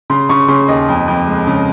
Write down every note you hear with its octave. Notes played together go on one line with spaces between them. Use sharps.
C#3 C6
C#3 C#6
C#3 C6
D#2 D#5
F2
F2
G#3
C#3